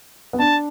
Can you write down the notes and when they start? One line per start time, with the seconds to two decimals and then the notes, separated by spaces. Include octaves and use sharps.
0.33 B3
0.39 D4 A5